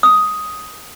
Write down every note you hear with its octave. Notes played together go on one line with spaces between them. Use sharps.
D#6